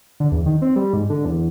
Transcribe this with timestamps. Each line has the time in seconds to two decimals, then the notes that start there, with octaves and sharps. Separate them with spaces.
0.20 D3
0.32 E2
0.46 D#3
0.62 C4
0.76 G3
0.93 G#2
1.10 D3
1.25 E2